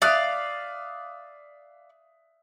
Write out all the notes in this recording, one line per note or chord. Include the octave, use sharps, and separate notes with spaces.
D5 E5 F5 D#6 F#6